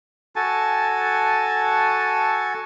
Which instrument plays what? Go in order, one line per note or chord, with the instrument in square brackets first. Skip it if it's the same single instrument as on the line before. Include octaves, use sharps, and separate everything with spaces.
[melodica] F#4 A4 G#5 A5